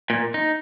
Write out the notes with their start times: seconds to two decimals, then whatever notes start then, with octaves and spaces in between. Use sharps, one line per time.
0.10 A#2
0.34 D#4